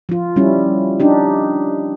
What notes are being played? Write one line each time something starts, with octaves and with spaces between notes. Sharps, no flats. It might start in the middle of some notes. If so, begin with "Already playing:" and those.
F3 F4
G3 C#4 E4
D4 D#4 G4